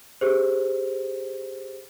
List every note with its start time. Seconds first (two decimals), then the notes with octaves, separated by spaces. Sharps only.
0.21 G4 G#4 C5